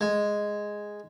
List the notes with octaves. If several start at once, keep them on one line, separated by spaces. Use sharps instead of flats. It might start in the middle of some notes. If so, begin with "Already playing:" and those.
G#3